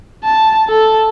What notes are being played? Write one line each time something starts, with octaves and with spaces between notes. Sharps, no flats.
A5
A4